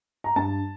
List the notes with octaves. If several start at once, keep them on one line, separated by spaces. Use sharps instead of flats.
A#5
G2 A5